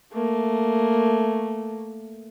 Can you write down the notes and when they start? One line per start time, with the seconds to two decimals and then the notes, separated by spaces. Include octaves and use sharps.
0.13 A3 A#3